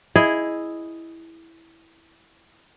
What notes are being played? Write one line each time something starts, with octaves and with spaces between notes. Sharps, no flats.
E4 G#4 D#5